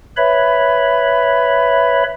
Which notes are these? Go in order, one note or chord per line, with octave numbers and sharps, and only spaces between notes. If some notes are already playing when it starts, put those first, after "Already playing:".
B4 C#5 E5 B5